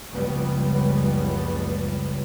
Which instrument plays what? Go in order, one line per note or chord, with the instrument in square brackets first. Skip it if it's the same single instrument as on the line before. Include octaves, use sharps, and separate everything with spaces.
[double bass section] F#1 C#2 C#3 F3 G3 B3